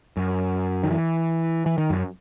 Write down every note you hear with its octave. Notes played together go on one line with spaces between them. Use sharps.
F#2
D#3
E3
E3
D#3
F#2